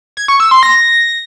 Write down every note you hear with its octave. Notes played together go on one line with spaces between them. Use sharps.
G#6
C#6
E6
C6
A#6